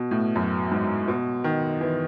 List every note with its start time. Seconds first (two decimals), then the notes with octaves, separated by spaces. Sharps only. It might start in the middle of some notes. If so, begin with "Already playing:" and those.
Already playing: B2
0.11 A2
0.36 F#2
0.72 G#2
1.08 B2
1.44 D#3
1.81 E3